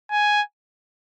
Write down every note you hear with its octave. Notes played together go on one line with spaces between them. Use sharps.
G#5